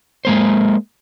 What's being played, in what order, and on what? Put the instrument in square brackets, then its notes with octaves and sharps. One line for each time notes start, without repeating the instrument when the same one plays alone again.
[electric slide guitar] G#3 A#3 C5